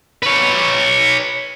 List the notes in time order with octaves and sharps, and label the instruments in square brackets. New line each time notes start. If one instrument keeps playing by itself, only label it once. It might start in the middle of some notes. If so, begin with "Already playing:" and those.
[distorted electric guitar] B4 C#5